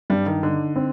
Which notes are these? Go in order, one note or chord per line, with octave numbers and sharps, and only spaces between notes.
G2 G3
D#3
D3 D#4
C4